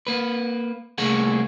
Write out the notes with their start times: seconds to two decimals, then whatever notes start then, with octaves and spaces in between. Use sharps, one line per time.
0.07 A#3 B4
0.98 C2 A3 A#3 G#4 F#5